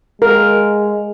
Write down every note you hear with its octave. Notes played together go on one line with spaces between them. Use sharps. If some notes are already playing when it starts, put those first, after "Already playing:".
G#3 A#4